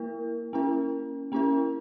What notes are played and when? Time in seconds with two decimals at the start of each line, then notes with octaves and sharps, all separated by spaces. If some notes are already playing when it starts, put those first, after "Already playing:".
Already playing: A#3 E4 A#4
0.53 A#3 C#4 E4 A#4
1.32 A#3 C#4 E4 A#4